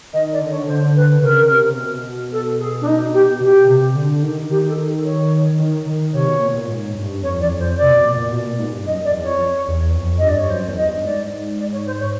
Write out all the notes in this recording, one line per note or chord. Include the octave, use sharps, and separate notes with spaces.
D#3 D#5
D5
D3
C#5
D3 C5
B4
C#3 A#4
C3
B2
A4
G#4
D4
D#4
G4
B2 G4
C3
D3
D#3
D#3 G4
A4
C#5
D#3
D#3
C3 C#5
B2
A#2
A#2
G#2
G2
F2 C#5
E2 D5
F2
C5
C3 D5
B2
A#2
A#2
B2
A#2
G#2
G2
F#2 D#5
D5
F2
E2
F2 C#5
E2
F2
G2 D#5
D5
C#5
F#2 C5
E2
D#5
G2
G#2 D5
D5
C#5
C5
C#5